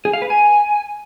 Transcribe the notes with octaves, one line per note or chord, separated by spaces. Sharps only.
G#4
F5
B4
G#5